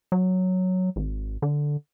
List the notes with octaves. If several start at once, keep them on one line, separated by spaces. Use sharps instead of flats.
F#3
G#1
D3